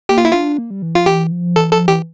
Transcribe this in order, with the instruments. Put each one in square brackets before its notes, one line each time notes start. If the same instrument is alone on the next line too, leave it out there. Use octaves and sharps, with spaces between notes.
[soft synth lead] A#3 [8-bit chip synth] G4
[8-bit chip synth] F4
E4
[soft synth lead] D4 [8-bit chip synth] F4
[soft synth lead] A#3
G3
E3
[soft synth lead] F3 [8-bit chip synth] F4
[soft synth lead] E3 [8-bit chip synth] G4
[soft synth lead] F3
[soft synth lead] E3 [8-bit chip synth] A4
[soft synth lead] F3 [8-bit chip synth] A4
[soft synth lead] E3 [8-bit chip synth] G4